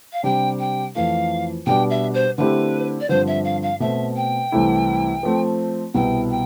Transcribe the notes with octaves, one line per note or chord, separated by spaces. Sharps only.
F5
C3 G3 D4 G4 G5
G5
F2 E3 A3 F5
B2 G3 D4 G5
E5
C5
D3 A3 C4 E4 G4 B4
D5
G2 D3 F3 C4 C5
E5
F5
F5
B2 A3 C4 E5
G5
C2 C3 E3 A3 E4
F3 A3 C4
C2 B2 B3 E4 G5
G5